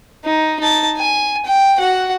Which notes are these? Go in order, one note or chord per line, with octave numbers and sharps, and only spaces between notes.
D#4
D#4 A5
G#5
G5
F#4 F#5